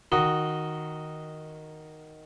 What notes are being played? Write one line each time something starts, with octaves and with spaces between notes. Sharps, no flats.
D#3 F#4 D#5